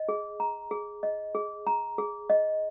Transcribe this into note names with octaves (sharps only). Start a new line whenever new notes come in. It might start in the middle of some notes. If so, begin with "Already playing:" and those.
Already playing: D#5
G#4
A#5
G#4
D#5
G#4
A#5
G#4
D#5